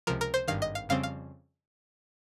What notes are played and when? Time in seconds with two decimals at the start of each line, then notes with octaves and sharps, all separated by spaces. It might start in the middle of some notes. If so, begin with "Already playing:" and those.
0.07 C#2 C3 F3 A#4
0.21 A#4
0.34 C5
0.48 G#1 G2 D#3 F5
0.62 D#5
0.75 F5
0.89 F2 C#3 G3 C4 F5
1.03 F5